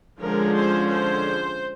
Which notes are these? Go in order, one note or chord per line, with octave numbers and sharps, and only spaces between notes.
D3 F3 G#3 C#4 A#4
C5
C5